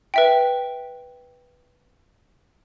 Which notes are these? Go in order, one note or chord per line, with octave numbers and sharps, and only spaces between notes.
B4 E5 G5